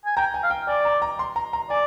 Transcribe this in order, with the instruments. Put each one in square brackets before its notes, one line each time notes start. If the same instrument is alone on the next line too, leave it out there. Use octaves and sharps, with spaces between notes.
[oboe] G#5
[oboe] G5 [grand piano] A#5
[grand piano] G#5
[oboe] F5
[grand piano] G5
[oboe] D5 [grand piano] G#5
[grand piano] A#5
A#5
C6
A#5
A#5
[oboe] D5 [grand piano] G#5